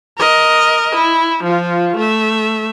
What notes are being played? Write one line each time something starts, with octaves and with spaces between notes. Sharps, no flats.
A#4 D#5
E4
F3 F4
A3 E5